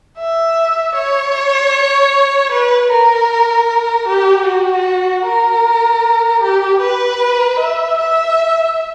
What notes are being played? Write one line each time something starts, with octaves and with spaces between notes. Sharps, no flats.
E5
C#5
B4
A#4
G4
F#4
A#4
G4
B4
E5
E5